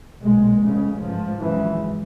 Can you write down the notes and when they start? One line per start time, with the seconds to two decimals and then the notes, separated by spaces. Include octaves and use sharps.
0.21 B1 A#2 G#3
0.61 F1 F2 C#3
1.00 A1 G#2 F3
1.40 G#1 F#2 C#3 E3